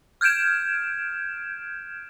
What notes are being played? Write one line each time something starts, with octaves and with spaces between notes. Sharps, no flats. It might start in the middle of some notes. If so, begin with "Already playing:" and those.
F6 G6 G#6 D7 E7